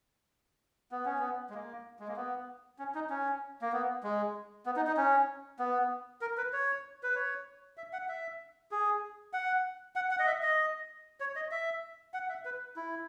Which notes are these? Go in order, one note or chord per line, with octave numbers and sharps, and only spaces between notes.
B3
C#4
B3
G#3
A#3
G#3
A#3
B3
C#4
D#4
C#4
A#3
B3
G#3
B3
D#4
D#4
C#4
B3
A#4
B4
C#5
B4
C#5
E5
F#5
E5
G#4
F#5
F#5
F#5
D#5
E5
D#5
C#5
D#5
E5
F#5
E5
B4
E4